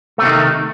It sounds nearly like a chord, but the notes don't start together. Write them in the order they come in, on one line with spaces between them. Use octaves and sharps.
A3 C3 D#3